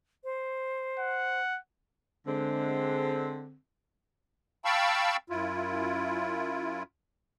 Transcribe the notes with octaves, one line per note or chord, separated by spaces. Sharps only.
C5
F#5
D3 G#3 C4
F5 G5 A5 B5 C#6 E6
F#2 E4 F4